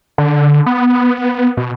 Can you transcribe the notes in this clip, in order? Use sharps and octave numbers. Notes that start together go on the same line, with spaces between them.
D3
B3
B2